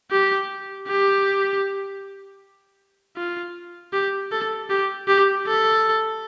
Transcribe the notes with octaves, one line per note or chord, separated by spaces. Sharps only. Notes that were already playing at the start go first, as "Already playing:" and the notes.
G4
G4
F4
G4
A4
G4
G4
A4